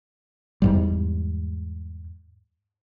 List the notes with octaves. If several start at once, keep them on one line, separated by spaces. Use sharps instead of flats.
E2 G#2 G3